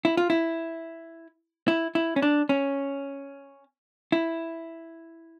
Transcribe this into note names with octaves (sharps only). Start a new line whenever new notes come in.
E4
F4
E4
E4
E4
C#4
D4
C#4
E4